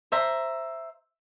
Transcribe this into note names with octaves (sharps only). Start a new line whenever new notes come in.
C5 E5 A#5